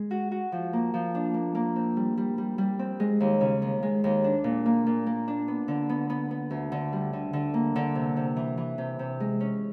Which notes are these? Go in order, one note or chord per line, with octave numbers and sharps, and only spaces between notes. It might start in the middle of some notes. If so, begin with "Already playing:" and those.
Already playing: G#3
F#4
F#4
F3
A#3
F3
D4
A#3
A#3
C4
G3
G3
G3
G3
C4
G#3
D#2
C#3
D#2
G#3
D#2
D4
A#2
A#3
A#2
A#3
D4
B3
D3
B3
B3
B3
D2
D3
G3
D3
D3
A#3
D3
C3
C3
E3
E3
C3
C3
G#3
C#4